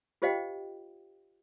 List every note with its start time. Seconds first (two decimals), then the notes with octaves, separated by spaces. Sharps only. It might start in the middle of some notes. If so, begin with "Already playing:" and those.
0.22 F4 G4 C5 D#5 F5 G5